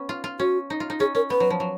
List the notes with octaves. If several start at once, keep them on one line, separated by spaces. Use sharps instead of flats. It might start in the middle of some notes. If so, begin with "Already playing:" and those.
Already playing: B3 C#4
F4
F4
C#4 F#4
D#4
F4
D#4
C#4 G#4
C#4 A#4
B3 B4
F#3
F3
F#3